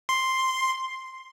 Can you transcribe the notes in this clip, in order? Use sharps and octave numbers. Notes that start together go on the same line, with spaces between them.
C6